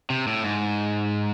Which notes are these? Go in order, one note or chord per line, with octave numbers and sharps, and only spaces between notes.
C3
A2
G#2